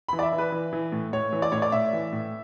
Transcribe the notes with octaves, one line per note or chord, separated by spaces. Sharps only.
E3 B5
D5
E5
E3
B4
E3
E3
A2
A2 C#5
E3
D5
A2 C#5
D5
A2 E5
E3
A2